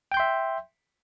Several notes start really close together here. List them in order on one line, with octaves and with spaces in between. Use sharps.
G5 G6 C6 E5